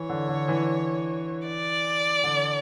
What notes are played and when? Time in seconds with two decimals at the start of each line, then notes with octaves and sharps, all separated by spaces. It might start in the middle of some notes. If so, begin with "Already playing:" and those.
Already playing: E3 C#5
0.09 D3
0.28 D3
0.48 E3
1.46 D5
2.23 D3